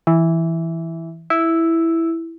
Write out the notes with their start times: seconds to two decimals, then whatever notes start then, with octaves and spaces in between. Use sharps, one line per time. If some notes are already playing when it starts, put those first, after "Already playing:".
0.07 E3
1.30 E4